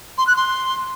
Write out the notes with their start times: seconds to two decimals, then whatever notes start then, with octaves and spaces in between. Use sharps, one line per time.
0.18 C6
0.27 F#6
0.36 C6